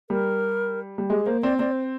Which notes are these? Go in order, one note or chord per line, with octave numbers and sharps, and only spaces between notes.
G3 A#4
G3
G#3 G4
A#3 C5
C4 D5
C4 D5
C5